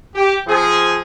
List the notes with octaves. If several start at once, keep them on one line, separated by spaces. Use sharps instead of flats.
G4
F3 C4 G#4